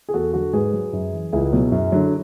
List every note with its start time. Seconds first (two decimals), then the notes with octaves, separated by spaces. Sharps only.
0.09 G#4
0.14 E2 F#4 A4
0.33 D3 F#3 F#4 A4
0.53 G#2 G#4 B4
0.73 F#3
0.93 F#2
1.13 E3
1.33 C#2 E4 G#4
1.53 B2 F#3
1.72 F#2
1.92 D3 F#3